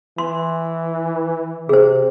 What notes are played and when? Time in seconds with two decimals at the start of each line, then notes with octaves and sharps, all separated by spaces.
0.18 E3 C6
1.69 C3 G#4 C5